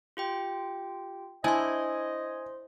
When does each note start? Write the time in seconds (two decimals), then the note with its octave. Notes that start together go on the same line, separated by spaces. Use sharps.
0.17 F4 G4 G5
1.44 D4 E4 C5 D#5 G#5 C6